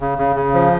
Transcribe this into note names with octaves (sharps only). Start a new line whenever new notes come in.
C#3
C#3
C#3
F3